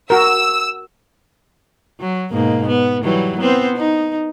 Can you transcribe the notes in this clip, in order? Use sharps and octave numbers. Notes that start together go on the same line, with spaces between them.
F#4 A#4 E6
F#3
G#2 B2 A#3
B3
E3 F#3 G3
B3 C4 C5
D#4